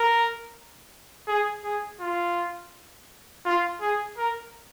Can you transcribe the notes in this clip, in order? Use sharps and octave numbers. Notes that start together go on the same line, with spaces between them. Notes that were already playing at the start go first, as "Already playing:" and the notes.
Already playing: A#4
G#4
G#4
F4
F4
G#4
A#4